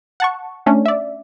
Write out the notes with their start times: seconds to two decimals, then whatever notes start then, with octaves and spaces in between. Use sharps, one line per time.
0.20 F#5 A5 C#6
0.66 A3 C#4 D4
0.86 D5 E5